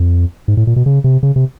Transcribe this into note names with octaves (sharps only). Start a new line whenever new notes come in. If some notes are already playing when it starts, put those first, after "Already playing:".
Already playing: F2
G#2
A2
A#2
B2
C#3
C3
C#3
C3